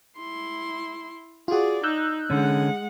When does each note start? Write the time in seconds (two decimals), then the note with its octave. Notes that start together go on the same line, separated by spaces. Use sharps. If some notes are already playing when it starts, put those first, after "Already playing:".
0.18 E4 C6
1.48 F4 F#4 G#4 D5
1.84 D#4 E6 F#6 G6
2.30 D3 G#3 C#4 F#5